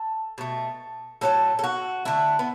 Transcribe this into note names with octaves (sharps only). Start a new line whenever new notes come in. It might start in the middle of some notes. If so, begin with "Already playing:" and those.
Already playing: A4
B2 A3
A2 F#3 A3 A4
A4
F#4
D3 A3 E4
B3